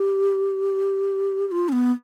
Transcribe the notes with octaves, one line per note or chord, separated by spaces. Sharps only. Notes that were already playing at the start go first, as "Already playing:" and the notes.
Already playing: G4
G4
F4
C#4
B3